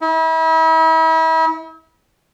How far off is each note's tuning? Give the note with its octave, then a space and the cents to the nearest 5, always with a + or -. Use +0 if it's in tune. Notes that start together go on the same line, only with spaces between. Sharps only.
E4 -40